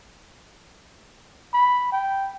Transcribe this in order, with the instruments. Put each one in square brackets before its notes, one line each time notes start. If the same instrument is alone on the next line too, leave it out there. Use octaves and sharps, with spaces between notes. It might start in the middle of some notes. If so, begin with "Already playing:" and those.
[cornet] B5
G5